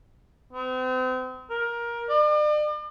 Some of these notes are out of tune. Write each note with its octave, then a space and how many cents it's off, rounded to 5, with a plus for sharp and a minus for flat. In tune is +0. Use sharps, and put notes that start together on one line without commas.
C4 -40
A#4 +15
D5 +40